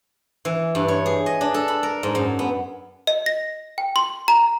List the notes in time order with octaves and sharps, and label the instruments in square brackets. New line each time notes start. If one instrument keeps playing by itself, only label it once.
[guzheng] E3
G2
C#5
G#4
D#5
D4
A4
B5
A#4
G#2
F#2
B3
[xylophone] D#5
A#6
G5
C6
A#5